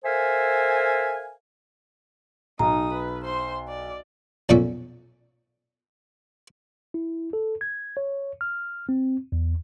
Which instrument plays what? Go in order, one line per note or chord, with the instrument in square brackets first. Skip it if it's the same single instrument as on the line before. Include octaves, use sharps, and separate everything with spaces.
[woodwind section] A4 A#4 C5 E5 F5 G#5
[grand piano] B1 [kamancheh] D#4 D#6 [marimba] A#5
[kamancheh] B4
C5 C6
D5
[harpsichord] B1 F2 A#2 C#4 D5 E5
[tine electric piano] E4
A4
G#6
C#5
F6
C4
E2